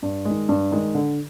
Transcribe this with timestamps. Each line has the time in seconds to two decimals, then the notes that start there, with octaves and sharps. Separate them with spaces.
0.02 G2
0.25 D#3 G#3
0.49 G2
0.71 D#3 G#3
0.95 D3